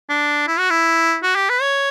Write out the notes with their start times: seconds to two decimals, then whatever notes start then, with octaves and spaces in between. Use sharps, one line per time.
0.09 D4
0.48 E4
0.59 F#4
0.70 E4
1.23 F#4
1.36 G4
1.49 B4
1.61 C#5